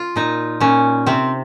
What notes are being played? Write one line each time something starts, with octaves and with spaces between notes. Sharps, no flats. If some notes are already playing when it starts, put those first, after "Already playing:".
Already playing: F4
A#2 D#4
A#2 C#4
C3 C4